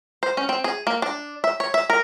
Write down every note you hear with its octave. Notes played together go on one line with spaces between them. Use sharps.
C5
C#4
C4
G#4
A#3
D4
E5
C#5
E5
A#4